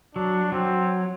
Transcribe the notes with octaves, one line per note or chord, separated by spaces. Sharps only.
F#3 D4
F#3 C4